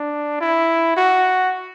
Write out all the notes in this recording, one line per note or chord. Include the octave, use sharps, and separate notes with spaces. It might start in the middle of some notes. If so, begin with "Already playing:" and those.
Already playing: D4
E4
F#4